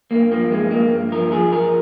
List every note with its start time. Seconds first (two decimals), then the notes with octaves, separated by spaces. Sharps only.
0.11 G2 A#3
0.32 F3 A#3
0.51 G2 G#3
0.71 G2 A#3
0.92 G2
1.12 F3 A#4
1.31 F3 G#4
1.52 F3 A#4